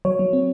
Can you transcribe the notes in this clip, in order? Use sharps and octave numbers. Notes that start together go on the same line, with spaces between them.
F#3 C#5
F#3
C4